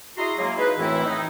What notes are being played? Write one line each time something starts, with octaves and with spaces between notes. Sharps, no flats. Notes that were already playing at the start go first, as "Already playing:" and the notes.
E4 F#4 G#4 D#5 A#5 C6
C#3 F#3 G#3 A#3
D#4 E4 G#4 B4
F#2 A2 E3 A3 C4 E4
D#4